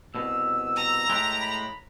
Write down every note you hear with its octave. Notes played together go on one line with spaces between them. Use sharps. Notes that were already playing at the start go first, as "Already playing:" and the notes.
C2 B2 E6
A#5
A2 G#3 G4
B5